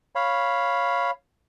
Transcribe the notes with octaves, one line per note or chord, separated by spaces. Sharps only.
C#5 F5 B5